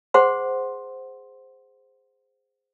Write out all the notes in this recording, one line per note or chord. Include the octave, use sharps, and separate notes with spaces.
G#4 C5 F#5 C6